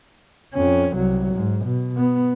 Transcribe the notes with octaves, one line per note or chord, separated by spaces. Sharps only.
F2 C#4
C2 F#3
G#2
B2
B3